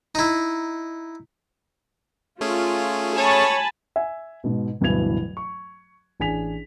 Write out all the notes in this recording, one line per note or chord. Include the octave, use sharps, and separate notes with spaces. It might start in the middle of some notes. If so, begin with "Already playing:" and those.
D#4 E4
A3 C#4 F4 G#4
C#5 G#5 A5 B5
E5 G#5
G#2 B2
D1 G2 B2 E3 G#6 F7
C#6
A1 D4 G#4 G#5 B6 F7